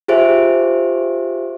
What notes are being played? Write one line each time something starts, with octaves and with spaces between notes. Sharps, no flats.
F4 G4 G#4 C5 E5